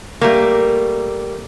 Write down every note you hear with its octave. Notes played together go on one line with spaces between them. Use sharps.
G3 A3 A#3